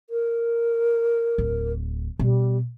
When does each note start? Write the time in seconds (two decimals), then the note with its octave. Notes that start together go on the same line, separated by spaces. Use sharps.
0.10 A#4
1.38 D1
2.19 B2 G3